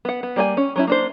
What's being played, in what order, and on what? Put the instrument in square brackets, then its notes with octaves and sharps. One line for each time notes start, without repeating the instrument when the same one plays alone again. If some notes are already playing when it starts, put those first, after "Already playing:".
[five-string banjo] B3 F#5
B3
G3 A#3 D5 D#5 G#5
C#4
F#3 C#4 E4
A#3 D4 C5